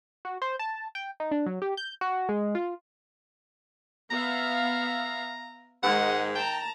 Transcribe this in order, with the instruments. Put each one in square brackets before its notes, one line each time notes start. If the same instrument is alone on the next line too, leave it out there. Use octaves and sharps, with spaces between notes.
[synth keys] F#4
C5
A5
G5
D#4
D4
F#3
G4
G6
F#4
G#3
F4
[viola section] B3 E5 F5 [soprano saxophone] A#5
[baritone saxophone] G#2 [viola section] D#3 G#3 D#5 [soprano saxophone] F#5
[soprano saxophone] G5 [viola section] A5 A#5